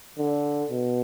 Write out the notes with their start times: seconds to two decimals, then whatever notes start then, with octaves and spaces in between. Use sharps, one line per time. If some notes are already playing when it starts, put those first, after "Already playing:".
0.18 D3
0.71 B2